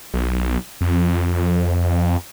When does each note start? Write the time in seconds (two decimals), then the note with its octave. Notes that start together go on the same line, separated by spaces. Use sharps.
0.14 B1
0.81 F2